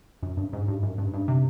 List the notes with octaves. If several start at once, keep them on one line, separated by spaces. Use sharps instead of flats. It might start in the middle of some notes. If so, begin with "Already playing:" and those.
F#2
G2
G#2
G2
F#2
G2
G2
C3